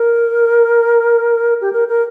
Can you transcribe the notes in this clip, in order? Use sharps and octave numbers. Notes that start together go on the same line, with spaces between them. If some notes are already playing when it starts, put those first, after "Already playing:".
Already playing: A#4
G4
A#4
A#4